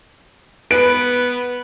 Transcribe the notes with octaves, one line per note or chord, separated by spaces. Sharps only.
B3 B4 D7